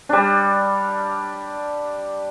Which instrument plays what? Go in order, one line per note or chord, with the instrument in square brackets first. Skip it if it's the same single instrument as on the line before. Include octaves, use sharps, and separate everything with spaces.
[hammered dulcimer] G3 D4